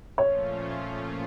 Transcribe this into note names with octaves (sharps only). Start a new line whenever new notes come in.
A#2 F3 A3 C#4 F4 C#5